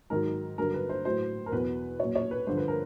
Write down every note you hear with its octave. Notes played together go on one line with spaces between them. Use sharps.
G#2 D#3 F#3 A#4
G2 D3 F#3 A#4
B4
C5
A2 F#3 C5
A#4
E2 B2 F#3 B4
A#2 F#3 C#5
C#5
B4
G2 D3 F3 C5
B4
A#4